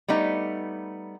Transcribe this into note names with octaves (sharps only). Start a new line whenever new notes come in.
G3 A3 B3 D#4